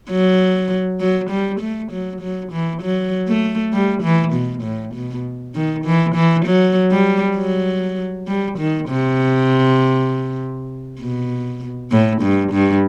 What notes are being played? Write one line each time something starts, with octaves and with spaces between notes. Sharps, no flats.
F#3
F#3
G3
A3
F#3
F#3
E3
F#3
A3
G3
E3
B2
A2
B2
D#3
E3
E3
F#3
G3
F#3
G3
D#3
C3
B2
A2
G2
G2